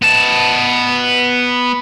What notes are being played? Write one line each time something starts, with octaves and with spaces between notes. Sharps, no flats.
B3 A5